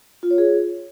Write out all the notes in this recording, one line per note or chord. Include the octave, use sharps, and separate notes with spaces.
F4
C#5
G#4